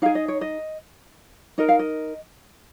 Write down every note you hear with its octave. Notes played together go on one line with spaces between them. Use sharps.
D#4 G#4 F5
D#5
C#5
D#5
D#4 A#4 D#5
F5
D#5